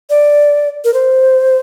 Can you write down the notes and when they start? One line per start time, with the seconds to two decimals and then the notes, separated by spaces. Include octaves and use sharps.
0.10 D5
0.84 A#4
0.94 C5